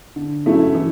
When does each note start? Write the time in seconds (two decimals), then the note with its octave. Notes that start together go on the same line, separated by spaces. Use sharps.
0.16 D3
0.46 F#3 A3 C#4 E4
0.74 E3